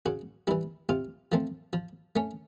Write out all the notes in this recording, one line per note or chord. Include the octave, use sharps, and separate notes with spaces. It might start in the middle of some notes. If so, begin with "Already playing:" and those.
C#3 F#4
E3 G3 E4
C3 F4
F3 A3 C4
F3
A3 C#4